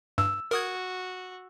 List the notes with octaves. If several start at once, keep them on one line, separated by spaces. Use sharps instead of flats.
G2 E6
F#4 A#4 D#6 G#6